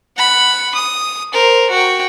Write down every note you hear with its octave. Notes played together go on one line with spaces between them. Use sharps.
F#5 B5
D#6
A#4 C5
F#4 G5